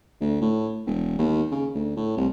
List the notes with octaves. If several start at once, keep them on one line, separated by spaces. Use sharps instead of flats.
D2
A2
E1
D#2
C#3
D2
A2
C2